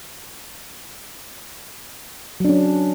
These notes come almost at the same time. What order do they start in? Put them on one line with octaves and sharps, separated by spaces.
F#3 D4 C#4